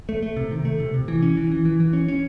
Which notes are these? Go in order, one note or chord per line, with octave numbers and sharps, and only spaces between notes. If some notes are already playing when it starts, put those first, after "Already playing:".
A3
A3
C3
D#3
A3
C3
C3
E3
C#4
E3
E3
E3
E3
C#4
C#4